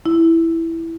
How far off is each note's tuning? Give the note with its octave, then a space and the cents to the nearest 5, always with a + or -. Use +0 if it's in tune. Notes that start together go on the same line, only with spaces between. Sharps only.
E4 +0